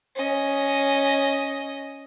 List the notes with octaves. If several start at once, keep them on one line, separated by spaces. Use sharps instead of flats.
C#4 D#5